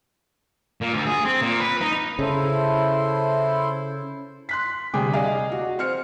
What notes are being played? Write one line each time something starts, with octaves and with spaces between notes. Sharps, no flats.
A#2
D2
G#4
C4
A#2
B4
D#4
C#3 E4 A4 C5
C6 F#6 B6
D2 C3 G3 G#4 G5 D6
G#4 D5 D#5 F5
F#4
C4 C5 F6 C#7